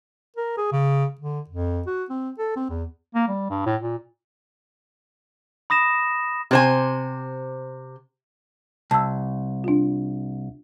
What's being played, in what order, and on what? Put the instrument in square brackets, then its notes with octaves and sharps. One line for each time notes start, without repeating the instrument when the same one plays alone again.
[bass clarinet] A#4
G#4
C#3
D3
F2
F#4
C4
A4
C4
E2
A#3
G3
G2
A2
A#2
[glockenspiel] B5 D#6 A#6 E7
[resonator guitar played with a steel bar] C3 C5 G#5
[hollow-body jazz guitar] C2 [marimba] A5 E6
[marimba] D4 F4